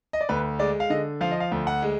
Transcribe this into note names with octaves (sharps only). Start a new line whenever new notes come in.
D#5
D5
D2 B4
G#3 D5
F5
D3 D#5
F3 F5
D#5
F5
D2
F#5
G#3